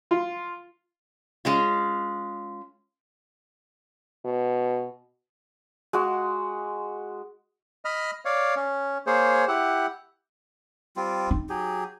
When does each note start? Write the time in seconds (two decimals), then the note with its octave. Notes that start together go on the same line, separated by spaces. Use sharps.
0.11 F4
1.45 G#3 C#4 F4
4.25 B2
5.93 G#3 F#4
7.85 D#5 B5 F6
8.25 C#5 D5 F5
8.56 C#4
9.07 A#3 G#4 C5 C#5
9.48 E4 G4 F#5
10.96 G3 C4 F4
11.31 D#4
11.49 F#3 G4 G#4